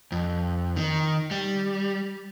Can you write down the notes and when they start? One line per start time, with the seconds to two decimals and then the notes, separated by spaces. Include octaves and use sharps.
0.12 F2
0.76 D#3
1.31 G3